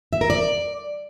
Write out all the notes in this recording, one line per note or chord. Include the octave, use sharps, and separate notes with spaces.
E5
A#4
D5